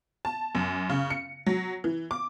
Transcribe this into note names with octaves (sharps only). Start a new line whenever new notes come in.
A5
F#2
C#3
C#7
F#3
E3
D6